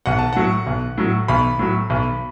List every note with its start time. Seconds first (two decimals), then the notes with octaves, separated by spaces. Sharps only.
0.06 B1 F#5
0.19 A5
0.33 A2 F#3 F#5
0.67 B1
0.98 A2 F#3
1.28 B1 B5
1.59 A2 F#3
1.90 B1